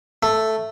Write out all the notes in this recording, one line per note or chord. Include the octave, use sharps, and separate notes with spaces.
A3